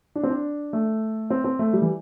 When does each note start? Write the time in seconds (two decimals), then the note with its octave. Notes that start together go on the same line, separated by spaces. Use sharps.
0.15 D4
0.23 C4
0.30 D4
0.73 A3
1.30 C4
1.44 C4
1.59 A3
1.73 G3
1.82 E3